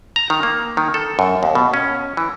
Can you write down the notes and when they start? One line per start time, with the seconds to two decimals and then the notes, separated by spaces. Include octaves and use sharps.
0.16 A#5
0.30 D#3
0.43 A#3
0.77 D#3
0.94 A4
1.19 F#2
1.43 D#2
1.55 B2
1.74 C#4
2.17 E3